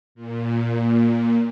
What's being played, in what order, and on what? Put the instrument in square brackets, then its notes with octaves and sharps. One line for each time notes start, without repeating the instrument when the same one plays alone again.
[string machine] A#2